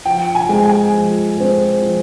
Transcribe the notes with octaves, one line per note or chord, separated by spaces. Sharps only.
F3 G5
G#5
G#3 C4
G#5
F3
G#3 C4
F3